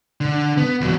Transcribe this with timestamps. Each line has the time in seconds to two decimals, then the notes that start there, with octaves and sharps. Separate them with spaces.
0.21 D3
0.58 B3
0.81 E2 F#3